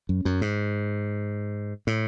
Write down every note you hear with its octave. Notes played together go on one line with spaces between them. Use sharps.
F#2
F#2
G#2
A2